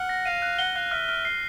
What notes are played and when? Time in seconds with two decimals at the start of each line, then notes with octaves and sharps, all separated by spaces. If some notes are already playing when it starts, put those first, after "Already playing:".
Already playing: F#5 F6
0.09 A#6
0.25 F5 D#7
0.42 F#6
0.58 F#5 G7
0.75 F5 F#6
0.91 E5 F6
1.09 F6
1.25 C7